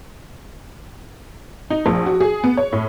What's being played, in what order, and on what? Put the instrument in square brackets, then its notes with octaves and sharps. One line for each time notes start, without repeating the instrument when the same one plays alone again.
[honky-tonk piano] D#4
A#1
F#4
G#4
B3
C#5
A2